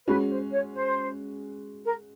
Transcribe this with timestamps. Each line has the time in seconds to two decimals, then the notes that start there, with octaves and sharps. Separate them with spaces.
0.07 G#3 C#4 F#4 B4
0.29 C5
0.51 C#5
0.73 C5
1.85 A#4